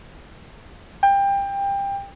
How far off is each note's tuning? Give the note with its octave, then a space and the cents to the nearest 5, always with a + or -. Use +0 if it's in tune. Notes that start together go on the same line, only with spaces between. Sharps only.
G5 +25